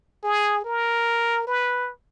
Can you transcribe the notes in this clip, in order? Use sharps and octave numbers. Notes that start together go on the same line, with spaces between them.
G#4
A#4
B4